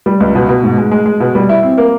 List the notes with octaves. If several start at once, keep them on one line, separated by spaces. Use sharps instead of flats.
G3
C#2
B2
B2
G#2
G#3
G#3
G#3
B2
G3
E4
C4
A#3